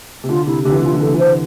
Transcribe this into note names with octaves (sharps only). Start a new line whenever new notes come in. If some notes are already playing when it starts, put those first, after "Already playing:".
C3
D3 F4
C3 E4
D3 G4
E3
D3
E3 F4
D3
E3 A4
D3
E3
D3 C5